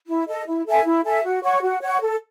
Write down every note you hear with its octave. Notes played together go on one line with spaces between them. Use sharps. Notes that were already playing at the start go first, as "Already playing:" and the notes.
E4
A4 D#5
E4
A4 E5 G#5
E4
A4 E5 G#5
F#4
C#5 F#5 C#6
F#4
C#5 F#5 C#6
A4